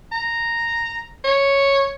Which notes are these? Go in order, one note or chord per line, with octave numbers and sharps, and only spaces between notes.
A#5
C#5